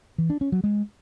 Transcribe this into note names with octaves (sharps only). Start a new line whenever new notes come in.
E3
D4
C#4
F#3
G#3